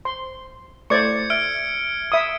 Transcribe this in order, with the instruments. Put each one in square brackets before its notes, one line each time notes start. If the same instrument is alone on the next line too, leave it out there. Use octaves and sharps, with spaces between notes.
[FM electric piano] C5 [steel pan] C6
[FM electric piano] A3 E4 [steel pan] C5 D5 C#6 [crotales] G#6 C#7
[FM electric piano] E5 [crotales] F6 D7
[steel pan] E5 D#6